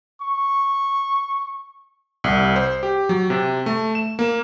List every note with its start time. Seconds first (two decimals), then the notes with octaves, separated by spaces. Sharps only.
0.22 C#6
2.24 C2
2.56 C5
2.83 G4
3.09 F#3
3.30 C3
3.66 A3
3.95 E7
4.19 A#3